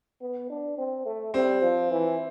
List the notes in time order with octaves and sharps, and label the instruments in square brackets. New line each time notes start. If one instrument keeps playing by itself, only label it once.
[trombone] B3
D4
C4
A3
[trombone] G3 [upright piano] C4
[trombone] F3
E3